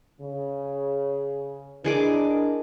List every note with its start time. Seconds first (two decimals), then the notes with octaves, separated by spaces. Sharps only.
0.21 C#3
1.84 E3 D4 G#4 A#4 D#5 D6